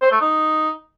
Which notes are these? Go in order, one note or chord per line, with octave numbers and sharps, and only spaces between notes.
C5
A3
D#4